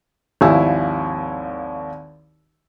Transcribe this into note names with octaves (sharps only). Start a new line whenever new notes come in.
G#1 D#2 F3 E4 G#5 E6